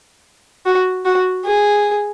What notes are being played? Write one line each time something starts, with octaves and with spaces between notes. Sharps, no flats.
F#4
F#4
G#4